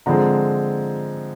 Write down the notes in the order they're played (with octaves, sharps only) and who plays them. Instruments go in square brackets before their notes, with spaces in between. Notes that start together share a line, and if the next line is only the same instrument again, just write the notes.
[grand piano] D3 F3 G#3 C4 A#5